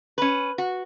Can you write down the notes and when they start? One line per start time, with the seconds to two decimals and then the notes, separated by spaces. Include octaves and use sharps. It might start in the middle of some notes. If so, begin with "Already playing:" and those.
0.18 C#4 B4
0.58 F#4